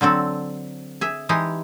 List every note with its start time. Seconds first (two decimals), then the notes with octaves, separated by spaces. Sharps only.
0.01 D3 F#3 C4 A4
1.01 G#4 E5
1.29 E3 G#3 D#4 G4 G#4